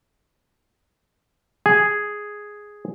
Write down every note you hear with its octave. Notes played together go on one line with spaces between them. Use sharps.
G#4